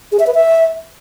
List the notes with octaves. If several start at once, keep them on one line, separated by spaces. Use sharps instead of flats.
G#4
E5
B4
E5